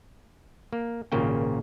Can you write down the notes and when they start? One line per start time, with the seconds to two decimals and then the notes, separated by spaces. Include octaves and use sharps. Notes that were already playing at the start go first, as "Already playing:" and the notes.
0.73 A#3
1.12 G#1 A#2 C#3 A#3 G5